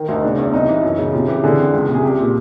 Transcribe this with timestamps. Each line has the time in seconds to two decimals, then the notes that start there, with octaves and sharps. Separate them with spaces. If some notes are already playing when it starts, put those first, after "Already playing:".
Already playing: D#3
0.08 D2
0.14 D#4
0.23 C#3 D4
0.38 E2
0.53 C2 D#4
0.68 E3
0.83 F#2
0.98 C#3
1.13 C3 F4
1.28 E3 G4
1.43 D3 G#4
1.58 F2
1.73 C#2
1.88 C3
1.94 G#4
2.03 C2 G4
2.18 A#2 G4